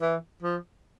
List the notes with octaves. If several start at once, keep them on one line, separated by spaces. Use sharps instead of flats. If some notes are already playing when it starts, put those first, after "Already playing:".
E3
F3